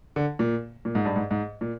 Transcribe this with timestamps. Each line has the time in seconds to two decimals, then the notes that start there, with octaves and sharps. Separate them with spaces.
0.16 D3
0.39 A#2
0.85 A#2
0.95 G#2
1.05 G2
1.16 G#2
1.31 G#2
1.61 A#2